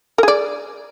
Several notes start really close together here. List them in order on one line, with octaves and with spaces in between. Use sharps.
A#4 G#4 D5